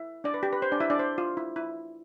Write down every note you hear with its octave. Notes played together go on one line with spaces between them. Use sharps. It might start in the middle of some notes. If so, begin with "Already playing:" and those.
Already playing: E4 E5
D4 D5
B4
G4
B4
C5
D4 D5
E4 E5
D4 D5
C5
F4
E4
E4